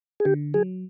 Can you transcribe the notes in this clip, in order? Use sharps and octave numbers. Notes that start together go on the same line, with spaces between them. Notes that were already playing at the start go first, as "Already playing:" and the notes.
G#4
D3 G4
F#3 G#4